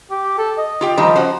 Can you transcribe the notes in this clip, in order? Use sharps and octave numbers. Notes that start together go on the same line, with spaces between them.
G4
A4
D#5
F4 G4 G5
D#3 F3 G3 D#4
C#4 F#4 C5